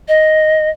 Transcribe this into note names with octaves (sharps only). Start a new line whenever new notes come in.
D#5